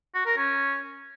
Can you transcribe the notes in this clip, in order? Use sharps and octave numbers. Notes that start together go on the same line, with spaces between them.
F#4
A#4
C#4